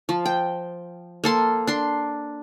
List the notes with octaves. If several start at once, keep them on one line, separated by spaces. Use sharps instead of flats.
F3
G5
A#3 A4 C6
D4 C6